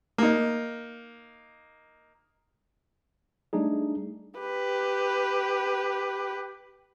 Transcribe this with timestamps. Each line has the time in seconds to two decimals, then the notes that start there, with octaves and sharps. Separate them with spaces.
0.18 A#3 D#4
3.53 G3 A3 D4 D#4 G#4
4.40 G4 B4